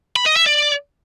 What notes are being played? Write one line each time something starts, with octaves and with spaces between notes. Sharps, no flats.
B5
D#5
E5
D5